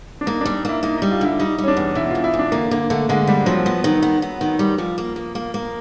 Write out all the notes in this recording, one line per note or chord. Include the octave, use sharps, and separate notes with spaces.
D4
A#3 D#4
G3 D4
D#4
A#3 E4
A#3 D#4
G3 D#4
F4
D3 E4
G3 D#4
G3 C#4
D4
E2
B2 E4
E2 F4
E4
E2
D4
D3 A#3
D3 A#3
D3 A3
D3 G#3
G3 C4
F3 F#3
B3
D#3
B3
B3
D#3
G3
F3 G3
A#3
A#3
A#3
A#3